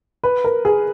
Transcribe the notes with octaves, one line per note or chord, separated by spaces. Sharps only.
B4
A#4
G#4